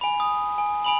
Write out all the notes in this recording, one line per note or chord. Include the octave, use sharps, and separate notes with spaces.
G#5 B5
D#6
G#5
G#5 B5 F#7